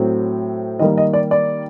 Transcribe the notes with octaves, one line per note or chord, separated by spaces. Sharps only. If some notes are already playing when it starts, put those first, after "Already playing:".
Already playing: A2 F#3 C4
D#3 G3 A#3 D#5
D#5
D5
D5